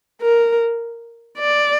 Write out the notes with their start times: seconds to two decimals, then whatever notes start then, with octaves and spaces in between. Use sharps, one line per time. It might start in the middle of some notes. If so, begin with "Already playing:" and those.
0.22 A#4
1.39 D5